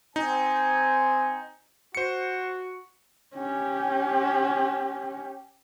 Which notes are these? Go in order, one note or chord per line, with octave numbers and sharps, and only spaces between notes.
C4 D#4 G#5
F#4 C5 C#7
C#4 G4